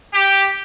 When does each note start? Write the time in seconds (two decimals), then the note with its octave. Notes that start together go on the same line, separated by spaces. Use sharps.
0.13 G4